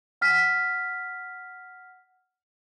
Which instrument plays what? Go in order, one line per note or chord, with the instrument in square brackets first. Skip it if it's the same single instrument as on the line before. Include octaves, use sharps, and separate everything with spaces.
[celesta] F#5 F6 B6